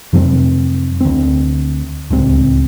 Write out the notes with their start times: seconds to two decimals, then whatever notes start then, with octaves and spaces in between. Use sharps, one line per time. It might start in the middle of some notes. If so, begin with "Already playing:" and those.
0.13 F2 C3 F#3 C4
1.01 D2 C4
2.10 D1 C#2 C4